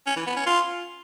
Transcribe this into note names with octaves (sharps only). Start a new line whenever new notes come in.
C#4
E3
B3
C#4
F4